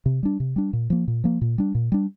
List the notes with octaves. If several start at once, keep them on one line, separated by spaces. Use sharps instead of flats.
C3
G3 D4
C3
G3 D4
A#2
F3 A#3
A#2
F3 A#3
A#2
G3 D4
A#2
G3 D4